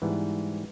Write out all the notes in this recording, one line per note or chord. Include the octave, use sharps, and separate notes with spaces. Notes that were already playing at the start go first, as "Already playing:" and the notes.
G#2 E3 G3 B3